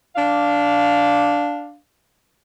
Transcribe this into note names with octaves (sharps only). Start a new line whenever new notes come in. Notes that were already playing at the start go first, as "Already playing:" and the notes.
D4 F5